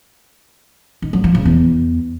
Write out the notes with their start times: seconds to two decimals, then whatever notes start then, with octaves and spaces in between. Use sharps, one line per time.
1.02 D#3
1.13 F#3
1.24 F3
1.35 C#3
1.45 E2